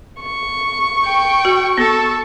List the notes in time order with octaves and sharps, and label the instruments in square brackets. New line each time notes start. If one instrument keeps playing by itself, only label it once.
[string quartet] C#6
[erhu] G5
[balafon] F#4
[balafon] B3 [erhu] A4